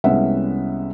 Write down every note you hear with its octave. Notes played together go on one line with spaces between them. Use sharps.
C2 G#3 B3 C#4 E5 F#5